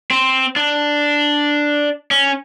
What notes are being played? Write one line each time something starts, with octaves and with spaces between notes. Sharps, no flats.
C4
D4
C#4